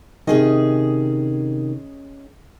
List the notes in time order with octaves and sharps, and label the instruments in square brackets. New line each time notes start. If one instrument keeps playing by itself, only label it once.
[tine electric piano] C3 D#3 [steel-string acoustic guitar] C#4 G#4 D#5